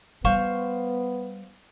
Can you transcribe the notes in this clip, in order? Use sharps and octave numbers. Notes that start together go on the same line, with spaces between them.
G3 B3 C5 F5 C#6